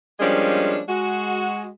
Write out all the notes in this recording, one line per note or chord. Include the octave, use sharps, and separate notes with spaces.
F3 G3 G#3 A#3 C#4 D4
G#3 F#4